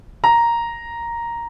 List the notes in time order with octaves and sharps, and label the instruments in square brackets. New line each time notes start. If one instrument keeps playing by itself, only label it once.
[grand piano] A#5